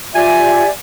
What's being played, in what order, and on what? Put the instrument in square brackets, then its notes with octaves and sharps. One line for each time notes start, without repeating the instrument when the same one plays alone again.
[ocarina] F4 [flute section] G4 D5 E5 [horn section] G#5